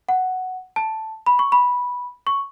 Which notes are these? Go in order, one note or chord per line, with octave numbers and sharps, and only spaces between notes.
F#5
A5
B5
C#6
B5
C#6